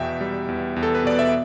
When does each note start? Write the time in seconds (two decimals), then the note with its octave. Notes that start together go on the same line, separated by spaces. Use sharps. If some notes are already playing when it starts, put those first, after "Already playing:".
Already playing: E2 B2 E5 G5
0.21 G3
0.48 E2
0.76 E2
0.83 A4
0.95 B4
1.04 B2 D5
1.19 E5